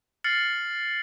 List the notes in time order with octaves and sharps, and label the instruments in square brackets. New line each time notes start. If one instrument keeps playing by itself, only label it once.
[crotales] F6 A6 C7 C#7 F#7